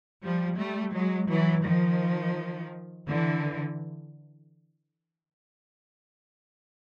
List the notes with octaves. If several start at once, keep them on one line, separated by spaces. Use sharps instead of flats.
F3 G3
G3 A3
F#3 G#3
E3 F#3
D#3 F3
D3 E3